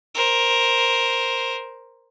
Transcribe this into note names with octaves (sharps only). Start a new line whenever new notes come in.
A#4 C5